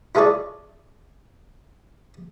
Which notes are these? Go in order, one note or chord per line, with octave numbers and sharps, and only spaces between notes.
E4 F4 G#4 A4 C#5 D5